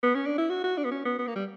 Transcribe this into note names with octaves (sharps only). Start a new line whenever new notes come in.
B3
C#4
D4
E4
F#4
F#4
D4
B3
C#4
B3
B3
A#3
G3